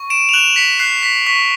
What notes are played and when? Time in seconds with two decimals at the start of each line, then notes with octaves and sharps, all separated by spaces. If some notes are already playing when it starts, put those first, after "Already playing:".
Already playing: C#6
0.10 D7 E7
0.29 F7
0.33 F#6 E7 F#7
0.56 B6 C#7
0.79 F#6 C7
1.03 B6
1.27 C#6 B6